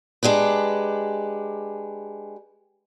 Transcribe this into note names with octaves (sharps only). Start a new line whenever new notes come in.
G#3 D4 G4 B4